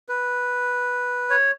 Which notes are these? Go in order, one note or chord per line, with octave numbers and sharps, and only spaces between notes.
B4
C#5